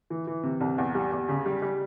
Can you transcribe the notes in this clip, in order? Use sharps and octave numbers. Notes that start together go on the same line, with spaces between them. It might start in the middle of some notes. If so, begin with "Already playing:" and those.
E3
E3
C3
C2
E2
G3
E2
C#3
G3
G3